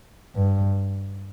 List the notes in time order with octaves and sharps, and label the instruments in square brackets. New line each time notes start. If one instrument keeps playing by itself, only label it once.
[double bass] G2